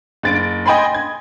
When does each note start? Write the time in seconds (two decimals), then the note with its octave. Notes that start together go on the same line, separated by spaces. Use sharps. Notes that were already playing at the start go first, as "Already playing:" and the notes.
0.23 F#1 A6 D7
0.66 D#5 G5 G#5 B5 C6
0.94 G#6